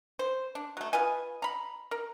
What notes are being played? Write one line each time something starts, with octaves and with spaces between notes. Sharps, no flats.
C5
D4
F#3 A3
F4 B4 D#5 G#5
A#5 B5
A#4